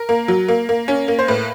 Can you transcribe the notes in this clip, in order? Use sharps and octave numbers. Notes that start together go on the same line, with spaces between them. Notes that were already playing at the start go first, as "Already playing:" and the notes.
Already playing: A#4
A#3
F#3
A#3
A#3
C#4
A#3
C5
A2 B4